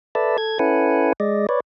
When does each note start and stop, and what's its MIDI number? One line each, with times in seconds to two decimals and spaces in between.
0.15 0.37 69
0.15 0.37 71
0.15 0.37 74
0.15 0.37 76
0.15 0.37 81
0.38 0.59 69
0.38 0.59 92
0.59 1.13 61
0.59 1.13 64
0.59 1.13 69
0.59 1.13 71
0.59 1.13 78
0.59 1.13 80
1.20 1.47 56
1.20 1.47 74
1.20 1.47 75
1.49 1.60 71
1.49 1.60 73
1.49 1.60 74